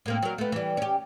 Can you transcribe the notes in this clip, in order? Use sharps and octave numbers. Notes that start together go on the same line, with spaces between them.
A2 A#3 C4
F#3 A#4
A3 B3
E3 G3
C#4 G4